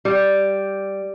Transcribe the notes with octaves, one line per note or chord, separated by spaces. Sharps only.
G3